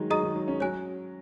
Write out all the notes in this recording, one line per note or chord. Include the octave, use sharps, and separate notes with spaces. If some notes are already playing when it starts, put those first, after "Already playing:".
Already playing: D#3 F#3 G#3
F#3 G#4 D#5 A#5 D#6
D#3
F#3
C#4
F#3 C#5 G#5 F#6